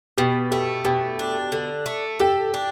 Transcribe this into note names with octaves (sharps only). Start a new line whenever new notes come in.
B2 G4
A3 G4
B2 G4
D4
D3
A3
G4 A4
D4